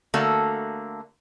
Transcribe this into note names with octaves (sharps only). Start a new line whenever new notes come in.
D3 A3 A#3 F#4 A4 E5